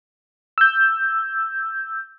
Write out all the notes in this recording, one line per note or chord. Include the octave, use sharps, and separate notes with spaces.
E6 G6